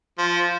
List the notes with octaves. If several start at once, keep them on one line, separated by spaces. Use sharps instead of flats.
F3